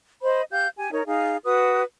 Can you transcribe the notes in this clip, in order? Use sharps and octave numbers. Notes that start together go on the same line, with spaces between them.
C5 D#5 B5
G4 F5 G6
G4 G#5
D#4 A#4 C#5
D#4 G#4 F5
F#4 B4 D#6